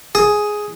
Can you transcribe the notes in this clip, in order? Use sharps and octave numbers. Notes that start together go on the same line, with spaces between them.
G#4